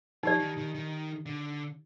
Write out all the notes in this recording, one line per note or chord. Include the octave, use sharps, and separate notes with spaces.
F3 D#4 G4 D5
D#3
D#3
D#3
D3